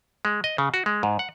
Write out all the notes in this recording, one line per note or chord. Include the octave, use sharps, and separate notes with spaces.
G#3
D#5
C#3
F#4
G#3
G#2
F#5